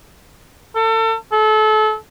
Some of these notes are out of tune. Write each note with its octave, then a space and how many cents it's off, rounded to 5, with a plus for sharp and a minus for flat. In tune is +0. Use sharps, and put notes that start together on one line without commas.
A4 +35
A4 -30